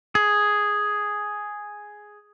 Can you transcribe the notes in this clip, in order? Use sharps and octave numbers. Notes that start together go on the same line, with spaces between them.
G#4